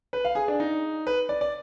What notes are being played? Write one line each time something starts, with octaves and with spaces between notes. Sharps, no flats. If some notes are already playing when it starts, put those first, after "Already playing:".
B4
F5
G#4
D4
D#4
B4
D5
D5